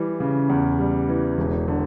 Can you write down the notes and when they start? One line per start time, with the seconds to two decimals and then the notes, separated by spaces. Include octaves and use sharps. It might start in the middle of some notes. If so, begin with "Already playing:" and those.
Already playing: E3 G3
0.20 C#3
0.50 E2
0.79 G3
1.09 E3
1.38 E1
1.68 D3